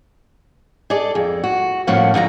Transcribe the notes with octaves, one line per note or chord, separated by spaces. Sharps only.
G#4 A4 D5 D#5
F2
F#4
A2 F3 A#3 C#4 F#5
D3 F3 G#5 A#5